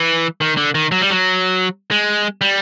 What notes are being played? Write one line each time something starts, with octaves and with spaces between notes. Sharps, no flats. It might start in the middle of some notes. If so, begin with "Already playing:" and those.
Already playing: E3
D#3
D3
D#3
F#3
G3
F#3
G#3
G3